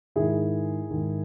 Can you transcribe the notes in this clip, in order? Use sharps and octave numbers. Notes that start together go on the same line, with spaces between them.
G#2 D#3 E4 G#4
G#2 D#3